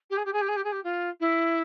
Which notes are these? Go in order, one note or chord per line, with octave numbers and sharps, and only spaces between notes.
G4
G#4
G4
G#4
G4
G#4
G4
G#4
G4
F4
E4